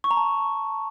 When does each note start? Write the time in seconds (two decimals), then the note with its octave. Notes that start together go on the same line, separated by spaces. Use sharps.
0.04 C#6
0.11 A#5
0.17 A5